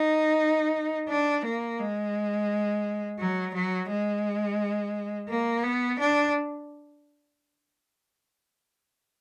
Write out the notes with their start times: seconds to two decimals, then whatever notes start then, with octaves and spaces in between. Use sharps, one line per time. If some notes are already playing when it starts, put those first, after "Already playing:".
Already playing: D#4
1.09 D4
1.45 A#3
1.79 G#3
3.20 F#3
3.54 F#3
3.90 G#3
5.29 A#3
5.64 B3
5.99 D4